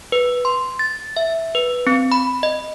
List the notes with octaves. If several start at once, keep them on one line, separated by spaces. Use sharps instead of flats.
B4
C6
A6
E5
B4
C4
B5
D#5